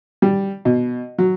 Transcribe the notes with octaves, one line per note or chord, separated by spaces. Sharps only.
G3
B2
F#3